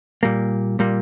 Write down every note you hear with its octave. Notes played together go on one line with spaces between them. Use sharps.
A#2 G3 A#3
A#2 G3 A#3